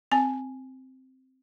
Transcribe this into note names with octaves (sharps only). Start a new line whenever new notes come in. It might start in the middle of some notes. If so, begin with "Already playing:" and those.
C4 G#5